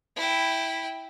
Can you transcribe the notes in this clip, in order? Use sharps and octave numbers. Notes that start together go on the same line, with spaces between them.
E4 G5